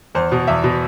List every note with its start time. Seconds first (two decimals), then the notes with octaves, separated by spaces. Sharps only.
0.15 E2 C5
0.32 B2
0.47 E2 E5
0.64 B2